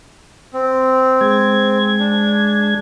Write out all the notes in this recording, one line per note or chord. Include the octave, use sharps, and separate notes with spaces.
C4
G#3 G#6
D4